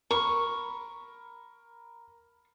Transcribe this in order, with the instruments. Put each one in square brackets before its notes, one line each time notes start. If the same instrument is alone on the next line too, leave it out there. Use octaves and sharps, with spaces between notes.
[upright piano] A#4 B5 [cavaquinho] C#6